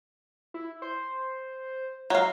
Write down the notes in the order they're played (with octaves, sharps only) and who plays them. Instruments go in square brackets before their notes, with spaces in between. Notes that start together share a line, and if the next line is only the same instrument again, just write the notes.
[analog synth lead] E4
C5
[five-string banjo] F#3 F5 [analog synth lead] A#5